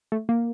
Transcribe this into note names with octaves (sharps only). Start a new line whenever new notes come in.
A3
A#3